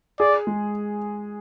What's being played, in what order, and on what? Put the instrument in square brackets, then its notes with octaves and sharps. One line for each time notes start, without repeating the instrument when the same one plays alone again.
[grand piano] G#4 [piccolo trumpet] D5
[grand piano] G#3